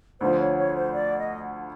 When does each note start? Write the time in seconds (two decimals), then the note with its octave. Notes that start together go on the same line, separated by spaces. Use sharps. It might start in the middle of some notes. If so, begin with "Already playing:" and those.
0.20 D2 D3 F3 C5
0.39 C#5
0.57 C#5
0.75 C5
0.94 D5
1.18 D#5